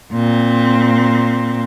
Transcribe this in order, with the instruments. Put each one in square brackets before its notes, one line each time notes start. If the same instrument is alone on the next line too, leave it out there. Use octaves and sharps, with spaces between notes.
[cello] A#2 C4